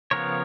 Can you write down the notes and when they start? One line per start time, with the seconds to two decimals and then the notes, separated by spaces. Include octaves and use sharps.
0.11 C#3 F3 B3 A#4 C#5